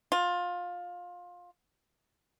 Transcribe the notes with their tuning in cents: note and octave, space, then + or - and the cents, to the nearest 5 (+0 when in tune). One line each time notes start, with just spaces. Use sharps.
F4 +20